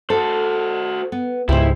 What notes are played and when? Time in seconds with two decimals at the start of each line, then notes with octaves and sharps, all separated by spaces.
0.10 F#4 A4 C5
1.12 B3
1.49 C#2 G#2 E4 G4 C5